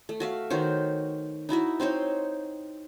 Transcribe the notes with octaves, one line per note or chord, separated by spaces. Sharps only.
A3
F#4 E5 F5
D#3 F#4 C5 C#5
D#4 E4 F#4 E5
C4 D#4 C5 C#5